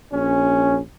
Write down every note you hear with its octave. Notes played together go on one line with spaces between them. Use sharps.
A#1 C#4